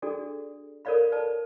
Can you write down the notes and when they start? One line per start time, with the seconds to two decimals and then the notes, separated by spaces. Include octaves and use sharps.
0.02 D4 F#4 G#4 A4 D5
0.85 A4 A#4 C#5 D5 F5 B5
1.12 B4 D5 A5